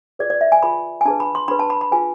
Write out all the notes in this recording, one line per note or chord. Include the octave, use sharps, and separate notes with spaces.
F4 G#4 B4 D5
D5
E5
G#5
F4 G#4 B4 B5
G#5
D4 G#4 B4 A5
B5
C6
D4 G#4 B4 B5
A5
B5
B5
F4 G#4 B4 G#5